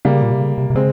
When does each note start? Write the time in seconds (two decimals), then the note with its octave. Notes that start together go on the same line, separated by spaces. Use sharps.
0.05 C#3 G3 A#3
0.23 A#2
0.32 C3
0.40 C#3
0.58 C3
0.70 C3
0.75 C#3 G#3 C4